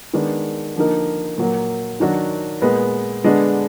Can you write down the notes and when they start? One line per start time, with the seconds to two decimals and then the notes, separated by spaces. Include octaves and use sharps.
0.13 D#3 G#3 B3 D4
0.76 D3 F3 A#3 D#4 A#4
1.38 A#2 F#3 A#3
2.00 D#3 F#3 D4 F#4
2.62 A#2 G#3 B3
3.24 D3 G#3 B3 D4